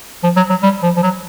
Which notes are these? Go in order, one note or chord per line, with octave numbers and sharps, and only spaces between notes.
F3
F#3
F#3
G3
F3
F3
F#3